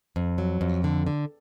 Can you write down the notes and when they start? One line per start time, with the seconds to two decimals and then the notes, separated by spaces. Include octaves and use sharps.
0.16 F2
0.38 F#3
0.61 F2
0.84 D3
1.07 D3